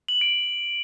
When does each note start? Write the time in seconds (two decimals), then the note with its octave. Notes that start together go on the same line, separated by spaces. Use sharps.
0.08 F#7
0.21 D7